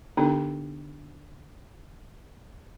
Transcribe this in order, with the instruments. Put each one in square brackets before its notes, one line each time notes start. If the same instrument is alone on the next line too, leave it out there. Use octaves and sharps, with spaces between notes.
[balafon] D3 B3 D4 D#4 G4 A4